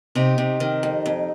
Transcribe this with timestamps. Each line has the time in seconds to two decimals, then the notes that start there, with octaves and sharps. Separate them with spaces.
0.15 C3 D#4 G4
0.38 C3
0.60 D#3
0.83 F2
1.06 F2